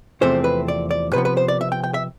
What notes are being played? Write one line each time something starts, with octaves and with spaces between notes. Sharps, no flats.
E2 C3 F3 A3 C4 C5
B4
D5
D5
C3 F3 B3 B4
B4
C5
D5
E5
G5
G5
E5